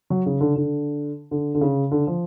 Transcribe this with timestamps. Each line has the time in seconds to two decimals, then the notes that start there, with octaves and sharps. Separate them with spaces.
0.10 F#3
0.26 C#3
0.41 D3
0.56 D3
1.31 D3
1.55 D3
1.61 C#3
1.91 D3
2.07 F3